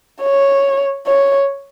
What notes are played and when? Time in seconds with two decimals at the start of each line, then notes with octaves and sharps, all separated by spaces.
0.22 C#5
1.07 C#5